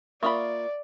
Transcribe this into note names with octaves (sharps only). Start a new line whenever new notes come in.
A#3 F4 D5 E5 B5 C#6 D#6